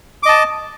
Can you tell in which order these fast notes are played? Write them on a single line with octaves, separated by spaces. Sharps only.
D6 D#5 A5